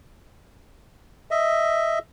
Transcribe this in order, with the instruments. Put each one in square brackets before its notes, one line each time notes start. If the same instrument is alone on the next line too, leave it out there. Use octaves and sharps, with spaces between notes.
[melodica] D#5 E5